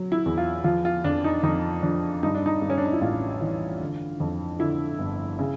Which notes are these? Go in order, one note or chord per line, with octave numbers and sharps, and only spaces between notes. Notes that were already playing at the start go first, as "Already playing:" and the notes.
Already playing: F#3
E4
E2
F4
F3 F4
F4
F2 D4
D#4
F2 D#4
F3 D4
G2 D#4
D4
D#4
G2
C#4
D4
D#4
E4
A1 F4
E3
D3
F2
D3 E4
G1
C#3